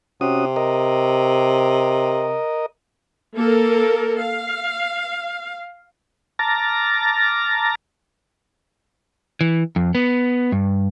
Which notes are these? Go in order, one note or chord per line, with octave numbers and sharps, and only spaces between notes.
C3 C#4 F#4 D#6
A#4 D#5
A#3 A4 A#4
F5
A5 A#5 D6 F6 A6 A#6
E3
F2
B3
G2